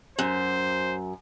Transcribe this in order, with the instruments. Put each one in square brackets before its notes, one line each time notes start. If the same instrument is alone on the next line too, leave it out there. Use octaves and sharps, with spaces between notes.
[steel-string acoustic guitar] F#2 [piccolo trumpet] C5